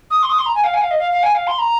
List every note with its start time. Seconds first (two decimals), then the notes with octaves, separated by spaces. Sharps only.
0.11 D#6
0.23 C6
0.29 D#6
0.38 C6
0.46 A#5
0.55 G#5
0.64 F5
0.74 G#5
0.81 F5
0.91 D#5
0.99 F5
1.12 F5
1.23 G#5
1.35 F5
1.47 C6
1.59 A#5